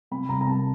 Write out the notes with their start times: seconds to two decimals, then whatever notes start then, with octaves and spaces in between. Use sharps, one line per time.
0.11 C3 B5
0.29 C2 A#5
0.41 A#5
0.47 C3 A5